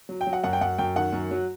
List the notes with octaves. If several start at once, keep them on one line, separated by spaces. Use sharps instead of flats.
F#3
G5
F#3
F#5
F#2 F#5
G5
F#2 F#5
F#2 G5
D#3 F#5
F#2
F#3